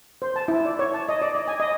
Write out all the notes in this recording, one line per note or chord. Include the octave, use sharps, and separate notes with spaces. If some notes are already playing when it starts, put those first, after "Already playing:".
C5
A5
E4
D5
C#5
A5
D#5
D5
D#5
G#5
D#5